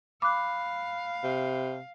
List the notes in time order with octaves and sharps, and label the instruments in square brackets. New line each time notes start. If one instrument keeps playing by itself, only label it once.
[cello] F5 [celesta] B5 F#6 [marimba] D6
[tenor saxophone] C3